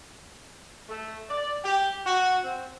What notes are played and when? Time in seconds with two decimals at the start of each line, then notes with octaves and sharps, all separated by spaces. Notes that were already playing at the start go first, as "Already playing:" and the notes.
0.89 A3
1.29 D5
1.64 G4
2.06 F#4
2.44 C4